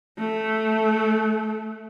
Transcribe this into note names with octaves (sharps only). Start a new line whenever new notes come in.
A3